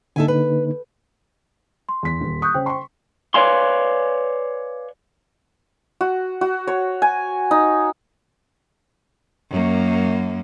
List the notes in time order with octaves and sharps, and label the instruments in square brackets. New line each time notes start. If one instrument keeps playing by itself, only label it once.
[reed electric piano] D3 A#3 D#4 [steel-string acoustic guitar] A4 E5 G#5
[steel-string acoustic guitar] B4
[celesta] C6
[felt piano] E2 B6
D#1
[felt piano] C#6 [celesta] D#6 F#6 G6
[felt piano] C#3 [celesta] C5 G5
[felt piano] C6 C#6
[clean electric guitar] B4 C#5 D5 F5 G#5 C6
[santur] F#4
F#4
C#5
G#5
D#4
[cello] F#2 A#3